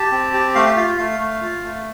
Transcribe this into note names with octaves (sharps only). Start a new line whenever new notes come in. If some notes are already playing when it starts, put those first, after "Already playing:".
Already playing: G4 A5
C4
G4
A3 F5
F5
F4 F5
A3 F5
A3
F4
A3